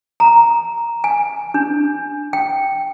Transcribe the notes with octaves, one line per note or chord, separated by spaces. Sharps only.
A#5
G#5
D4
G5